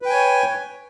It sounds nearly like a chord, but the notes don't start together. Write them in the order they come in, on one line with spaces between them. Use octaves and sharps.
B4 G5 G#5 C#5